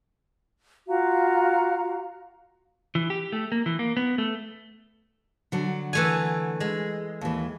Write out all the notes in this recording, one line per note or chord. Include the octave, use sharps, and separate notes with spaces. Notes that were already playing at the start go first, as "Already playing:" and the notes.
F4 F#4 F5 A#5
E3
G4
A3
A#3
E3
A#3
B3
A3
D3 F#3
E3 A3 G#5
G#3
D#2 E3